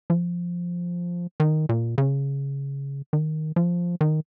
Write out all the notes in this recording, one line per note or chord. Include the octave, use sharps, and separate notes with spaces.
F3
D#3
A#2
C#3
D#3
F3
D#3